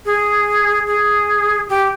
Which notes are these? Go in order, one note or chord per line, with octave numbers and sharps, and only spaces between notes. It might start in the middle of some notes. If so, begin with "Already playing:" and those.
G#4
G#4
G4